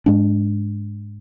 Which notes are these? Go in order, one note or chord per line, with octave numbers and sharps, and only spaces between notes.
G#2 G#3 D4